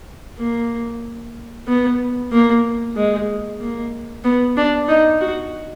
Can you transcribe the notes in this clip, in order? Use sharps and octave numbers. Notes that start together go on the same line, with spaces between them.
A#3
B3
A#3
G#3
A#3
B3
D4
D#4
F#4